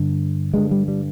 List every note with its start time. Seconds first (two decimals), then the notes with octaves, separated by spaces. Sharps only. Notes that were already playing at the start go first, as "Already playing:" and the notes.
Already playing: G2 D3
0.54 G2 D3 G#3
0.71 G3
0.88 G3